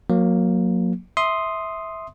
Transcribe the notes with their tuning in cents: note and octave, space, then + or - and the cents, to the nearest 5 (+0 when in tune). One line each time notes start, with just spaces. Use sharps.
F#3 -25 A#3 +0
E5 -15 C6 +0 D#6 +0